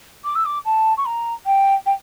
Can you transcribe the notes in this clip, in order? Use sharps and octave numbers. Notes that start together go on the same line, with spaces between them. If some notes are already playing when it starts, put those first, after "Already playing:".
D6
E6
D6
A5
C#6
A#5
G5
G5